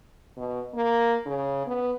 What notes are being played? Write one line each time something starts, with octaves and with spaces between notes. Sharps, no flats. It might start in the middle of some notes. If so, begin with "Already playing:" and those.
B2
A#3
C#3
B3